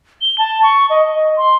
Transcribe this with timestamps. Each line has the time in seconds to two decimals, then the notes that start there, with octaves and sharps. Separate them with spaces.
0.21 G7
0.38 A5
0.63 C#6
0.90 D#5
1.37 C6